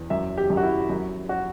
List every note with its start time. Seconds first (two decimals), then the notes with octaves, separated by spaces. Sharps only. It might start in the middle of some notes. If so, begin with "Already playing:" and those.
Already playing: E2
0.10 F#2 E5
0.37 G4
0.50 F#2
0.57 F#4
0.63 E4
0.90 F#2
1.29 F#4